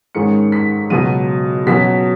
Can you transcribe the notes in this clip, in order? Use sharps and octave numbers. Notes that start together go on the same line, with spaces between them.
G#2 D#3 G#3 C#4 C#7
B6
C#2 B2 F#3 D#7
B2 F#3 C#4 B6